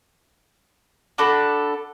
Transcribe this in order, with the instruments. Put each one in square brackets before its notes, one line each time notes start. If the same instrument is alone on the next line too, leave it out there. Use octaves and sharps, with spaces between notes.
[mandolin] D4 F#4 A4 B5